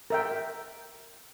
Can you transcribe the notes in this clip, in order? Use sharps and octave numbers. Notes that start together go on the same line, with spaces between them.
A#4 E5 G5